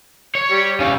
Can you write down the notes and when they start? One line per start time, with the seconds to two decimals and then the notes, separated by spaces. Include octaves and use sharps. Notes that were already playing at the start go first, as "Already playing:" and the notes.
0.35 C#5
0.51 G3
0.80 C#3 E3 F5